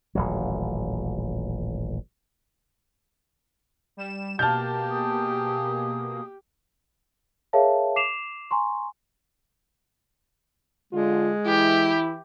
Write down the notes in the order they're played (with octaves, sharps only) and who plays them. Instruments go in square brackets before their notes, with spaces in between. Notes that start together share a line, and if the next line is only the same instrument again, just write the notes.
[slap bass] D#1 A1 F#3
[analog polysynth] G3 E7
[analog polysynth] B2 A#3 [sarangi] G4 [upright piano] A5 F6 G6
[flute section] G#4 D#6
[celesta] G#4 A#4 C#5 E5 F5 A5
D6 C7 E7 F7
G#5 A#5 C6 C#6
[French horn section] D3 F4 [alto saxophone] G#3
[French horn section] E3 E4 [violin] G4